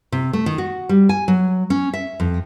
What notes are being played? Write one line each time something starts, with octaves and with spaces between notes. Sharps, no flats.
C3
A3
D#3
F#4
G3
G#5
F#3
C#4
E5
F2